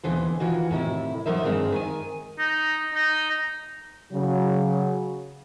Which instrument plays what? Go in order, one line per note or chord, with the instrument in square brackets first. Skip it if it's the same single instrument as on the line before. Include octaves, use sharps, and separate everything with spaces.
[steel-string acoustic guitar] D#2 B2 D3 E3 C5
D#3 E3 F4 F#4
A2 C3 D#3 E4
F#3 D#4 A#4 C5 E5
G2 D#3 G#3 C4
D#3 G#5
[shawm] D#4
D#4
[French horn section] C#3 F#3